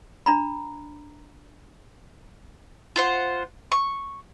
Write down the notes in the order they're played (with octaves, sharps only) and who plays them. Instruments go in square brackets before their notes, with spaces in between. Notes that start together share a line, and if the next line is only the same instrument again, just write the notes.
[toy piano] D4 A#5 B5
[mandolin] F4 C5 F#5
C#6